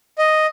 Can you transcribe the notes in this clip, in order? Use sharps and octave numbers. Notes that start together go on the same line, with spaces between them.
D#5